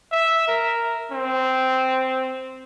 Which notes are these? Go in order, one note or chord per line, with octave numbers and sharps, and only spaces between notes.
E5
A#4
C4